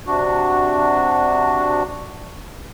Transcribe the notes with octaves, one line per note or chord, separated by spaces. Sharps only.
C3 D4 F#4